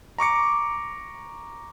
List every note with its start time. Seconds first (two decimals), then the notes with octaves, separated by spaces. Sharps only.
0.18 A#5 C#6 D6 C#7